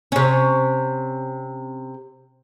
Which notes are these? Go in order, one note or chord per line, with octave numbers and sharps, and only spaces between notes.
C3 C#4